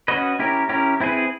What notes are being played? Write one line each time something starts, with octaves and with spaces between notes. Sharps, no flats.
C#4 F#4 B4 D#5
C#4 E4 G4 A#4
C#4 E4 G4 A#4
C4 E4 G#4 B4